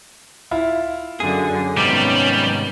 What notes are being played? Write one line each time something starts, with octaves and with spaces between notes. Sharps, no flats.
E4 F4
F#2 D3 G#4
G#2 C3 D#3 G3 B3 C#4 D6